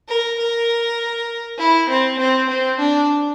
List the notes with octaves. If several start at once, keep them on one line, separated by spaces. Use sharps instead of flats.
A#4
A#4
E4
C4
C4
C4
D4